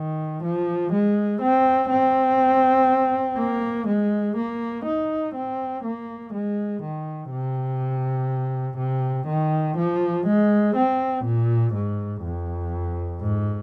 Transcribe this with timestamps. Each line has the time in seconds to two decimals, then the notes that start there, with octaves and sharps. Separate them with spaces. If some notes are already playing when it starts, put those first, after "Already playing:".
Already playing: D#3
0.43 F3
0.92 G#3
1.41 C4
1.90 C4
3.37 A#3
3.87 G#3
4.36 A#3
4.84 D#4
5.34 C4
5.83 A#3
6.33 G#3
6.82 D#3
7.31 C3
8.78 C3
9.27 D#3
9.77 F3
10.26 G#3
10.76 C4
11.24 A#2
11.73 G#2
12.23 F2
13.21 G#2